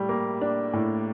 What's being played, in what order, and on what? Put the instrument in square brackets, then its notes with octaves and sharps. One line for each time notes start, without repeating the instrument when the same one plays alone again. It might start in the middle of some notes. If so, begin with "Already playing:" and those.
Already playing: [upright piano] A2 G3
A#3
D4
A2